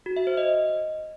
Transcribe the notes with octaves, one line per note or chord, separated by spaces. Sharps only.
F#4
E5
C5
D#5